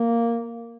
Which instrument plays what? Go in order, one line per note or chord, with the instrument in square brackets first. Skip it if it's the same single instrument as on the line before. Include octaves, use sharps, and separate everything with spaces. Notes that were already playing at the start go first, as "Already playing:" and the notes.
Already playing: [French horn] A#3